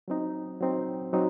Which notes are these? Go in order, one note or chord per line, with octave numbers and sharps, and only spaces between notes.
F#3 C4 D#4
F#3 C4 D#4
F#3 C4 D#4